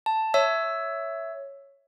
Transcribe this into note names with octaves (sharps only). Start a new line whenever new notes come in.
A5
C#5 E5 E6